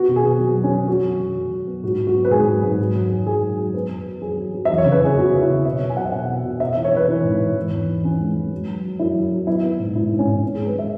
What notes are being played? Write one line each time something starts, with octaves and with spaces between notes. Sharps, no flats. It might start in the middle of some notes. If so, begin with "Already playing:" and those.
Already playing: B3 F#4
B2
G#4
B3
F#3
F#3
C#4
F#3
F#3 F#4
F#2
F#2
F#2
F#2
B3
G#2 F#4
F#3
F#4
B3
B4
G#2 G#4
F#3
G#2
F#3
F#2
F#2
F#2 G#4
F#2
F#3
B3 B4
F#2
F#3
F#2 G#4
F#3
F#3
E2 E5
C#5
C#3
B4
E3 G#4
B3 F#4
C#3
E4
C#3
B2 E5
F#3
G#5
B2 F#5
E5
B2 F#5
B3
B2
B3 E5
E5
E3
C#5
E3 B4
E3
G#2
G#2
E3
E2
E3
E3 C#4
G#3
G#3
F#2
F#3
F#3
F#2 E4
F#2
F#3
B3 E4
B3
G#2
G#2 E4
G#2
C#4
G#2
B3
G#4
G#3
B4
E5